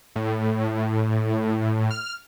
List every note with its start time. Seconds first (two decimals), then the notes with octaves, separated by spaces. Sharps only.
0.16 A2
1.91 F6